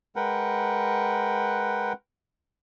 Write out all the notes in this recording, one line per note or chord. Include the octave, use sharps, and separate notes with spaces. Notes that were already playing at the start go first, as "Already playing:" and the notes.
G#3 A#4 B4 F#5 G5